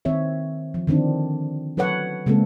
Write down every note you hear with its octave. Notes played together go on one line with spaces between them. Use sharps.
D#3 C4 C#5 E5
F3
D3 D#3 C4 D4
F#3 A4 B4 C#5 F#5
C#3 G#3 A#3 C4 A4